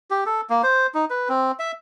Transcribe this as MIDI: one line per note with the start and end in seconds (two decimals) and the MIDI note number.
0.10 0.24 67
0.26 0.41 69
0.50 0.62 58
0.63 0.87 72
0.94 1.05 63
1.10 1.29 71
1.29 1.52 60
1.59 1.72 76